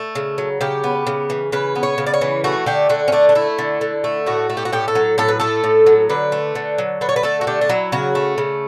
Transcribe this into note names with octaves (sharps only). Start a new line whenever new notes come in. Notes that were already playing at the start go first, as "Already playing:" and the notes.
Already playing: A3
C#3
F#3
C#3 G4
B3
C#3
E3
C#3 B4
B3
C#5
C#3
D5
C#5
E3
A3 F#4
D3 G4
D3 F#4
C#4
A3 D4
D4
A3 E4
D3
D3
A3
A2 F#4
A3
G4
F#4
A2 G4
A4
F#3
A2 A4
B4
A3 A4
A2
F#3
D3 B4
A3
D3
F#3
D3 B4
C#5
B4
A3 A4
F#4
D3 G4
D4
F#3 E4
C#3 F#4
A3
C#3